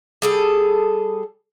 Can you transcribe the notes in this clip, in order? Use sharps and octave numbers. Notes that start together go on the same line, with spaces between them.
G3 G#4 A4